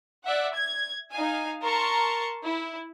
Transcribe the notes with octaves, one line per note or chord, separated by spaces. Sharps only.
D5 E5 F#5
G#6
D#4 F5 G#5
A#4 A5 A#5 C6 C#6
E4